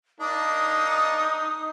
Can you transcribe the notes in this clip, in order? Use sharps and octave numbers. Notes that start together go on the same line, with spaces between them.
A#3 D4 D#4 D#6